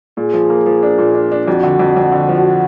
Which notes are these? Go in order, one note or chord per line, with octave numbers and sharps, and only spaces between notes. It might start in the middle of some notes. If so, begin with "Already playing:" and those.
A#2 G#4
F3
A#3
F3
D4
A#2
D4
D4
F2 F#4
D3
F2
F2
D3
F3